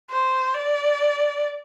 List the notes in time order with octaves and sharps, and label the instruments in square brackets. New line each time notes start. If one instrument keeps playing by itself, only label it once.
[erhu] C5
D5